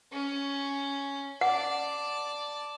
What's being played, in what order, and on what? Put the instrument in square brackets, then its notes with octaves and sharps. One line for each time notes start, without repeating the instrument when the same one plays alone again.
[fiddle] C#4
[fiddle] D5 A5 [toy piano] F#5